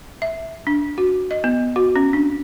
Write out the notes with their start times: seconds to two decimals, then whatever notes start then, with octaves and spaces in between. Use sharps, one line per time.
0.22 E5
0.67 D4
0.98 F#4
1.31 D#5
1.44 B3
1.76 F#4
1.96 C#4
2.13 D4